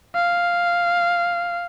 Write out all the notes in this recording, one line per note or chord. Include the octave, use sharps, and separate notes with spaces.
F5